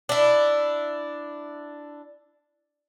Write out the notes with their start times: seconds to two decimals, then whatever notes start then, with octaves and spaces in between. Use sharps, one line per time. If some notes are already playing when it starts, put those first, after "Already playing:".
0.09 D4 E4